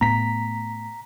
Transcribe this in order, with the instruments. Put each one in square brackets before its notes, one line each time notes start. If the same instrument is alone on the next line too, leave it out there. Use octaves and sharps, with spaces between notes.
[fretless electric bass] A2 A3 B3 [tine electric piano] A#5 B6